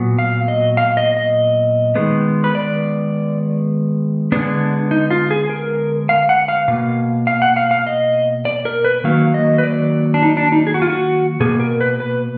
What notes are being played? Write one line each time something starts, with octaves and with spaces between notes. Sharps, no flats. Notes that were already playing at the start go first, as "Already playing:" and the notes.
Already playing: A#2 F#3 B3
F5
D#5
F5
D#5
D#5
D#3 G#3 B3
B4
D5
D3 G#3 B3 D4
D#4
F4
G#4
A#4
F5
F#5
F5
B2 A#3 F5
F5
F#5
F5
F5
D#5
D5
A#4
B4
D#3 F#3 A#3 F5
D#5
B4
D5
D4
D#4
D4
D#4
G#4
F#4
F4
F#4
B2 A#3 G#4
A#4
B4
B4